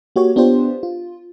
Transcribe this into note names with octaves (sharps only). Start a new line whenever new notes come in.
A#3 F#4 G4 C#5
B3 D4 F4 G4 C5
F4